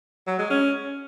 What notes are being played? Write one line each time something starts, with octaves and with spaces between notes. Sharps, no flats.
F#3
G#3
C#4